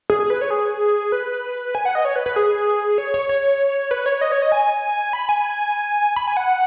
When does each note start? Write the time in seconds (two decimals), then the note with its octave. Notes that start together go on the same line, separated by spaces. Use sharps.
0.10 G#4
0.20 G#4
0.30 B4
0.41 C#5
0.51 G#4
1.12 B4
1.75 G#5
1.85 F#5
1.95 D#5
2.05 C#5
2.16 B4
2.26 B4
2.36 G#4
2.98 C#5
3.14 C#5
3.29 C#5
3.91 B4
4.06 C#5
4.21 D#5
4.32 C#5
4.42 D#5
4.52 G#5
5.13 B5
5.29 G#5
6.16 B5
6.28 G#5
6.37 F#5